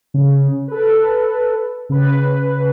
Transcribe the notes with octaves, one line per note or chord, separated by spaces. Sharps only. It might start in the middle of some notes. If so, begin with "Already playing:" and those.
C#3
A4 B4
C#3 B4